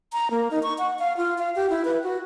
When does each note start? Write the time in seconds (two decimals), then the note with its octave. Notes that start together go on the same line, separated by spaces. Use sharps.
0.13 A#5
0.31 A#3
0.51 D#4
0.63 C#6
0.78 F#5
0.99 F5
1.17 F4
1.38 F5
1.56 G4
1.70 E4
1.85 B4
2.04 F#4